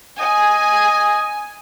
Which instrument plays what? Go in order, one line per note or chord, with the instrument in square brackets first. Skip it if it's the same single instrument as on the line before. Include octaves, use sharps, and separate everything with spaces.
[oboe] D#5 [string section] G#5